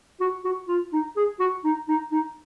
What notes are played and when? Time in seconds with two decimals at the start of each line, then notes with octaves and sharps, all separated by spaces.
0.21 F#4
0.44 F#4
0.68 F4
0.93 D#4
1.16 G#4
1.40 F#4
1.64 D#4
1.88 D#4
2.12 D#4